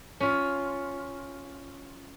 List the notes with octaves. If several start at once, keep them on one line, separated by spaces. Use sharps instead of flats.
C#4 F4